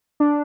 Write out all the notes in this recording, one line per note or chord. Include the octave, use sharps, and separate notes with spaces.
D4